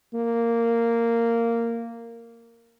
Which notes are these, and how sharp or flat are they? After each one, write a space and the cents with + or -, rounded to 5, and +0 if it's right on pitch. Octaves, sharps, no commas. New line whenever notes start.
A#3 -10